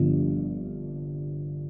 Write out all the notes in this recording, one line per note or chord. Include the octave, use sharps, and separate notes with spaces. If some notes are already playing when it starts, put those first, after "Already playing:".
Already playing: G1 G2 D3 F3